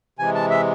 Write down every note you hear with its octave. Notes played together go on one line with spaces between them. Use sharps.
C3 E3 G#3 G#5
A5
E5